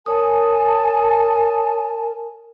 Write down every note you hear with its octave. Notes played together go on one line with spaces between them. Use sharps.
A#4 C#5 G#5 A5 D#6